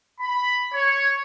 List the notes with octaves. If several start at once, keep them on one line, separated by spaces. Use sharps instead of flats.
B5
C#5